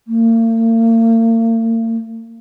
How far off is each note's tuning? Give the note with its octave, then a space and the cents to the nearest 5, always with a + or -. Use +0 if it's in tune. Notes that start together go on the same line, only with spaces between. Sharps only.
A#3 -45